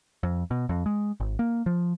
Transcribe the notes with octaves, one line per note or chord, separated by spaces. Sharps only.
F2
B2
F2
G#3
G#1
A#3
F3